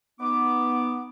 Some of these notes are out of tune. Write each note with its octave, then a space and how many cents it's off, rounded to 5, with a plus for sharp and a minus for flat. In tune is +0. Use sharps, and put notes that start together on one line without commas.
B3 +0 D#4 +0 D6 +0